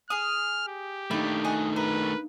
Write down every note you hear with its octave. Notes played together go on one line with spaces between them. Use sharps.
G#4 D#6 F6
G4
D#3 A3 A#3 D4 D#4 B5
G#4 D#5 F#5
A#4 B4